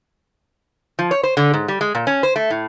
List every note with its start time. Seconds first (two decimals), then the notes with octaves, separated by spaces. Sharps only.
0.99 F3
1.11 C#5
1.23 C5
1.37 D3
1.54 G#2
1.68 G3
1.81 G#3
1.95 A#2
2.07 C#4
2.23 C5
2.36 A3
2.50 A2